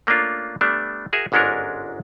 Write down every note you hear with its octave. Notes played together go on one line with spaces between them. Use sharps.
A3 A#3 C#4 D4 F4
G3 A3 B3 D4
F#4 G#4 A#4 E5
G1 G#2 G#3 C#4 D4 A#4